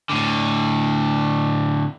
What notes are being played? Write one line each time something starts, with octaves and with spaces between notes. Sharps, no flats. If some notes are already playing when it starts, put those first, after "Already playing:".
A2 D3